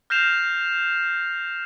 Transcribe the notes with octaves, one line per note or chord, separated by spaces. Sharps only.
F6 G6 A#6 C7 E7 F7